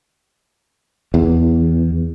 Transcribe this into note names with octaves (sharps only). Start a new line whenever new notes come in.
E2